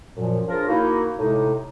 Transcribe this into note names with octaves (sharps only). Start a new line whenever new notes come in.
F#2 A#2 F3
C#3 F3 D4 F4 G#4 A#4
A#3 D#4 E4 F#4
A2 C3 G#3 D#4